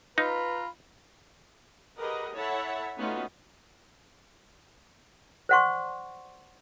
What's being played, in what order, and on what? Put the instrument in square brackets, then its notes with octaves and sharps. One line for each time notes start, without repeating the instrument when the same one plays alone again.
[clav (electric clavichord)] D#4 [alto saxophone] F4 [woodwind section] B4 A#5 [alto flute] B5
[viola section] G4 G#4 A#4 B4 D#5 F#5
E4 A4 C#5 E5 F#5 A5
A3 B3 C#4 D#4 F4 F#4
[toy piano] C5 D5 F#5 G#5 C6 C#6